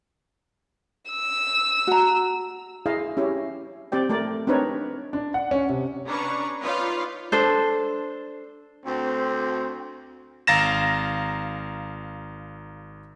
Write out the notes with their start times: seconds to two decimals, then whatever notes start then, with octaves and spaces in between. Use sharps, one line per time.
1.11 E6
1.87 F#4 A#5
2.86 E4 G#4 D#5 F5
3.17 C#4 E4 G4 C#5
3.92 C4 G4 D5 G5
4.09 A3 A#4 D5
4.47 C4 D4 D#4 A#4 B4 C#5
5.13 D4
5.34 F#5
5.51 C#4
5.69 C3
6.06 C#4 D4 B4 A#5 C#6
6.61 D#4 F4 B4 C#5 D5 F5
7.32 D4 A4 C5
8.86 D2 C4
10.47 G#1 F5 A#5 A6 A#6 E7